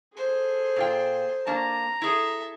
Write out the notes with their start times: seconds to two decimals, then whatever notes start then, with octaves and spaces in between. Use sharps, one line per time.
0.17 G#4 A4 C5
0.76 A#2 F4 G5
1.47 A#3 D4 A5 A#5
2.02 E4 G#4 A4 E5